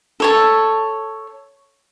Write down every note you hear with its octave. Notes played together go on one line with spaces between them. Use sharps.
A4 C#5 A5